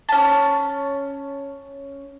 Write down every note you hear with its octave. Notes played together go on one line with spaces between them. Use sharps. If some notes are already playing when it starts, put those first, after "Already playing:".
C#4 A5